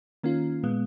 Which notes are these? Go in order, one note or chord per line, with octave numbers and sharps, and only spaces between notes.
D#3 A#3 C#4 F4
A#2 G#3 B3